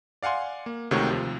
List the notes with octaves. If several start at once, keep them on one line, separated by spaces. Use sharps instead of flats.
D5 F5 F#5 G#5 C6
A#3
C#2 C3 D#3 A3 F#4 C#5
D#2 C3 F3